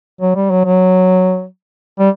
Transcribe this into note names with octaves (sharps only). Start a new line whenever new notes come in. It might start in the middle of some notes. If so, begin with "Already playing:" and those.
F#3
G3
F#3
F#3
G3